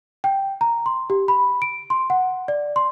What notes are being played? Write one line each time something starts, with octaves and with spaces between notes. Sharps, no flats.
G5
A#5
C6
G4
B5
D7
C6
F#5
D5
C6